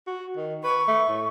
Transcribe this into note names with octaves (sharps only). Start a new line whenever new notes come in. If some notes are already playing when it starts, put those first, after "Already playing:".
F#4
D#3
B4 C#6
A3
A2